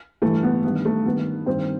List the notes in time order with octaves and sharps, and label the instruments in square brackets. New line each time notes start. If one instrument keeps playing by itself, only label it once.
[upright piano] G2 E3 A3
B3
G2 D#3 B3
A3
G2 D#3 B3
G2 D#3 C4